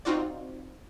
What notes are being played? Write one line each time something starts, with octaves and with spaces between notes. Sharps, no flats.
C4 D#4 F4 F#4 D5